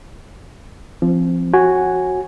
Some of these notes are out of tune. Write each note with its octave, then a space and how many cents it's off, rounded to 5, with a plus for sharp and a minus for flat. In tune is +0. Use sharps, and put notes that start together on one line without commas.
F3 -20 C4 +0
F#4 +0 C#5 -30 G#5 +0